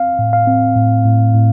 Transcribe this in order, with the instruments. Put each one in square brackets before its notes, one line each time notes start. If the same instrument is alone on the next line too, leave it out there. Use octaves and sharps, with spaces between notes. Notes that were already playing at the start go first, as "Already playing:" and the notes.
Already playing: [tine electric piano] C4 F5
A2
F5
C4
A2
A2
A2